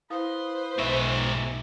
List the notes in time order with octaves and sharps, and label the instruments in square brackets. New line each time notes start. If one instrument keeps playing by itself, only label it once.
[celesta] E4 F5 D#6 [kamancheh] B4 C5
[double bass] B1 [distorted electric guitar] G#2 E5 [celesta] C#6